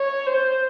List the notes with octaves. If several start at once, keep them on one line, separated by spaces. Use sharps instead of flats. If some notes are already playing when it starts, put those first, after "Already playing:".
Already playing: C#5
C5